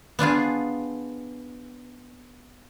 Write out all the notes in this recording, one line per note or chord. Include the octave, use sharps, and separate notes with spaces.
B3 D4 F4 G#4